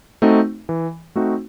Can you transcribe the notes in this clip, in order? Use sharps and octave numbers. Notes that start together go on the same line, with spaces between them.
A3 C4 D#4 F#4
E3
A3 C4 D#4 F#4